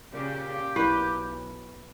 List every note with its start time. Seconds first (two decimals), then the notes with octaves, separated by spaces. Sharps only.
0.13 A#2 C#3 G4
0.76 B1 E4 A#4 B4